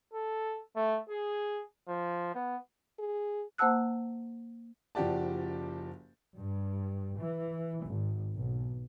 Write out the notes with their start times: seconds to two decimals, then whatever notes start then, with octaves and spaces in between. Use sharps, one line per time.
0.14 A4
0.77 A3
1.10 G#4
1.88 F3
2.35 B3
2.99 G#4
3.58 A#3 C5 F#5 A5 E6 F#6
4.95 F#1 F3 F#4 G4 D5 A5
6.36 G2
7.19 E3
7.85 G#1
8.34 B1